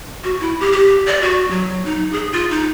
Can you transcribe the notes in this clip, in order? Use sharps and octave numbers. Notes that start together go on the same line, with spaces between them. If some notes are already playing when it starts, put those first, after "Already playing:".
F#4
E4
G4
G4
D5
F#4
F#3
D#4
G#4
F4
D#4